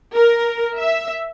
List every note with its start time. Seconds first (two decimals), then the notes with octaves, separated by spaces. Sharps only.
0.15 A#4
0.79 E5